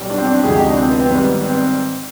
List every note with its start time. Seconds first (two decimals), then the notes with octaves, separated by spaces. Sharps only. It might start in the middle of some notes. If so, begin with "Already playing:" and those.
Already playing: B1 B2 G3
0.10 D4
0.18 C4
0.27 D4
0.39 G4
0.43 D2 C3 F3 G#3 G#4
0.52 G4
0.60 D#4
0.69 D4
0.77 C4
0.88 B3
0.99 C4
1.10 G#1 G#2 G3 B3
1.44 C4